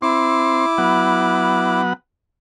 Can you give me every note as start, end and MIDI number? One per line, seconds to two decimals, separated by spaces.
0.02 0.66 60
0.02 1.82 64
0.02 0.66 84
0.02 1.82 86
0.78 1.93 54
0.78 1.93 59
0.78 1.93 78